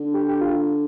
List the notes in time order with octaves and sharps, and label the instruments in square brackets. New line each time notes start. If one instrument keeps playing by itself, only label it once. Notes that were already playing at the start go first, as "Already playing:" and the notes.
Already playing: [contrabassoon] D3
[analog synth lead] G4
G4
F4